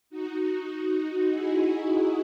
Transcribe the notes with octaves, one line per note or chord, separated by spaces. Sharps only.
D#4 F#4
E4 G#4